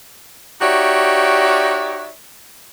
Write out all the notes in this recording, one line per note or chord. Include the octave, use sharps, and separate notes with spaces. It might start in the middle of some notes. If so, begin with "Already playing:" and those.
D#4 F#4 G4 C#5 D5 E5